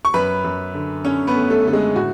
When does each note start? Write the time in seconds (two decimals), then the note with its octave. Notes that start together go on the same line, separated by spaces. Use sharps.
0.05 C#6
0.14 F#2 B4 B5
0.44 F#2
0.74 D3
1.05 D3 C#4 C#5
1.27 B3 B4
1.35 A3
1.50 A3 A4
1.66 D3 A4
1.73 G#3 G#4
1.95 A2 F#4